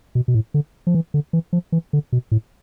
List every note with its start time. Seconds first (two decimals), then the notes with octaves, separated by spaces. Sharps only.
0.15 B2
0.28 B2
0.34 A2
0.54 D3
0.87 F3
0.95 E3
1.14 D3
1.33 E3
1.53 F3
1.72 E3
1.93 D3
2.12 B2
2.31 A2